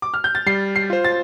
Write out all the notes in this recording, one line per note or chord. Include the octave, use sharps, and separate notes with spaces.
D6
F6
G6
A6
G3 C7
C7
F4 C5
A6